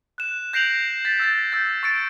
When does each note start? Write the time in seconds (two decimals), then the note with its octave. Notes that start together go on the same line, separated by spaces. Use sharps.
0.18 F#6 E7
0.53 G6 A#6 C7 D7 F7 F#7
1.05 A6 B6
1.20 E6 G6 A6
1.52 E6 G6 A6
1.83 C#6 E6 A6 C#7 D7